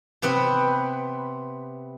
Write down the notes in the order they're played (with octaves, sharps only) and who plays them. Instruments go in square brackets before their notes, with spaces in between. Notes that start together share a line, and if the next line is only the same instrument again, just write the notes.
[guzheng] C3 B3 C4 B4